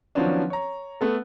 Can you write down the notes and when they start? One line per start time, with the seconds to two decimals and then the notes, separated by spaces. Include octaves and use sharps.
0.15 D#3 F3 F#3 B3 C#4 D4
0.50 C#5 A#5
1.01 A3 B3 A4